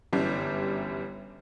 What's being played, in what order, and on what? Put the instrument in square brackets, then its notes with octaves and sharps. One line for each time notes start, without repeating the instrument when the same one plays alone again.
[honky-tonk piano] G1 F#2 E3 G3